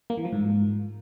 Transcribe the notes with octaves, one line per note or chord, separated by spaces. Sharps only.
A#3
E3
F3
G#2